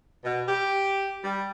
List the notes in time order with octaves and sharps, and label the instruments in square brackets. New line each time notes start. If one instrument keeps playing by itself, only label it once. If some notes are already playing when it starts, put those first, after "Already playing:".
[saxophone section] B2
G4
G3